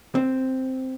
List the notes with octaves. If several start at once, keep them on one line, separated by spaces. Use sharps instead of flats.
C4